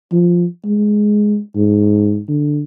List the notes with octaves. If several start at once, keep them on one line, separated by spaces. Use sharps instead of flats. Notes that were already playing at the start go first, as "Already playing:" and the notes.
F3
G#3
G#2
D3